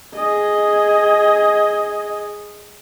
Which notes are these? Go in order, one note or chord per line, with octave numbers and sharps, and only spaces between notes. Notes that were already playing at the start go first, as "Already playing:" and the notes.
G#4 D#5